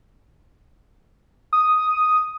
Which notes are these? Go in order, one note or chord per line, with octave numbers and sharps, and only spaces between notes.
D#6